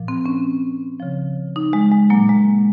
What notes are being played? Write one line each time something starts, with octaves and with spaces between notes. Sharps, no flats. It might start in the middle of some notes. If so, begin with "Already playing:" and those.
Already playing: A#2 F3
C4
C#4
C#3 F3
D#4
G#3
G#3
A#2 F#3 A#3
G#3